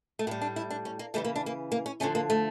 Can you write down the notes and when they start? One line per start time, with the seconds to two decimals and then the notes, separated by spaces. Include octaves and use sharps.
0.19 A3
0.27 A2 A#3
0.31 G3
0.41 D4
0.56 E4
0.70 D4
0.85 C#4
0.99 A#3
1.14 C#3 E3 G3 A3
1.25 A#3
1.36 D4
1.46 A#3
1.72 A#3
1.86 C#4
2.00 D3 F3 A3 C#4
2.15 A#3
2.30 A3